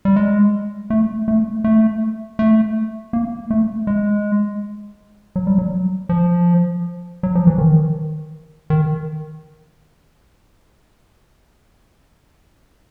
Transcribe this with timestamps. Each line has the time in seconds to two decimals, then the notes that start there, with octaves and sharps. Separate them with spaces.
0.05 G3
0.16 G#3
0.90 A3
1.28 A3
1.64 A3
2.39 A3
3.13 A#3
3.50 A3
3.87 G#3
5.36 F#3
5.47 G3
5.58 F#3
6.09 F3
7.23 F#3
7.35 F3
7.47 E3
7.58 D#3
8.70 D#3